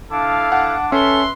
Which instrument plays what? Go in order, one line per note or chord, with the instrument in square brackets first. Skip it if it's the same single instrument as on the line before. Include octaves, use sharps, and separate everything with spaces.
[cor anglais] D4 [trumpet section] E4 A4 F5
[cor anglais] D4 [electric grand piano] F#5
[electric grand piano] C#4 [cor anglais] A4 [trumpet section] B4 E5 C6